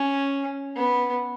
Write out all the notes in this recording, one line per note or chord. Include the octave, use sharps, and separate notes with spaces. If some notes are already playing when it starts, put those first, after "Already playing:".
Already playing: C#4
B3